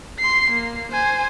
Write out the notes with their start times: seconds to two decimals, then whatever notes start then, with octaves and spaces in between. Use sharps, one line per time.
0.19 C6 C7
0.51 A#3
0.92 C5 G#5